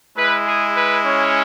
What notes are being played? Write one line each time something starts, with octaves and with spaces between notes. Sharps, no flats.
G#3 E4 B4
G#4
B4
C#4 C#5